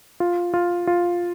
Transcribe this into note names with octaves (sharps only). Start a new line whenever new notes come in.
F4
F4
F4